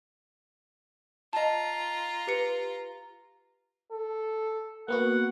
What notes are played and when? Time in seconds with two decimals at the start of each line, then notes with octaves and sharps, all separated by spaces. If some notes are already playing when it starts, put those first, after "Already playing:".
1.33 F4 D#5 A5 A#5
2.27 G4 B4 C#7
3.92 A4
4.88 A#3 B3 F#4 F#5